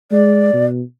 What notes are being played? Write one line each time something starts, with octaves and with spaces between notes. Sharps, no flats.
G#3 D5
B2